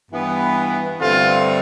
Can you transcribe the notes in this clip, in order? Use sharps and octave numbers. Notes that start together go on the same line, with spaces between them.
G2 E3 B3
G2 D3 A3 C4 F4